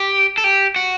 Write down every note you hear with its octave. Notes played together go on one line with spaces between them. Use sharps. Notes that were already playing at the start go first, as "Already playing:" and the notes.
Already playing: G4
A4
G4
F#4